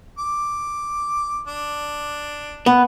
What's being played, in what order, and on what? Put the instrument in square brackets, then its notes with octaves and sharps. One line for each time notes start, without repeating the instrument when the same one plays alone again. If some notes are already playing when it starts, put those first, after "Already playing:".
[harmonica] D6
D4
[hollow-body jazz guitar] B3